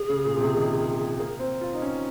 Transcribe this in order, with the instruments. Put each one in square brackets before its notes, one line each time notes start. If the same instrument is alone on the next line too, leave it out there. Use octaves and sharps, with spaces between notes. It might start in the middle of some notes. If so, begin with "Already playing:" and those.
Already playing: [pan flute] G#4
[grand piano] C#3
A#2
A#2
C3
D#3
A#3
C4
F4
D#4
C#4